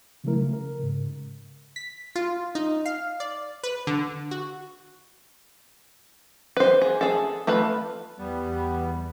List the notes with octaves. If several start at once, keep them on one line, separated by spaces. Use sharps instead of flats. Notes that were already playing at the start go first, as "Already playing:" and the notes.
C#3 F3 F#3 A3 E4 A#4
C#3
A#4
G#2 C#3
B6
F4
D#4
F5
D5
B4
D3
F#4
B4 C5
G#4
G#4 A4
A3 F4 B4 B5
E2 G3 B3